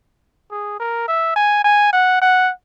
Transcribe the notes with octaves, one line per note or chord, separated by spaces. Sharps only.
G#4
A#4
E5
G#5
G#5
F#5
F#5